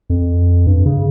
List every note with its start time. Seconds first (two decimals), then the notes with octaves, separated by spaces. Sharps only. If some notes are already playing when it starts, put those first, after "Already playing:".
0.10 F2
0.67 G2
0.86 C#3